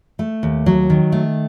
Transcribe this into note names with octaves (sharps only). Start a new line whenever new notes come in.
A3
D#2
F#3
D#3
A3